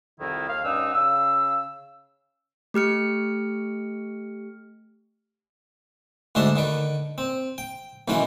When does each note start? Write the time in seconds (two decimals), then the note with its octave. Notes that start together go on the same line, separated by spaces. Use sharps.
0.19 C2 F2 D#3 D#4 E4
0.48 D#2 A#3 F5
0.64 G2 C#4 D#4 F#5 E6
0.93 C#3 F5 E6
2.74 A3 G4 F6 C#7
6.35 D2 G#2 D4 F#4 E5 C6
6.56 D3 D#3 B4
7.18 C4
7.58 G5
8.08 B1 B2 D#3 E3 C#4 F#5